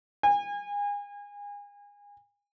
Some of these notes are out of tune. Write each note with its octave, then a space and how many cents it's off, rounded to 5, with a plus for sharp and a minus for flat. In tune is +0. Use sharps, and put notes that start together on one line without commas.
G#5 -30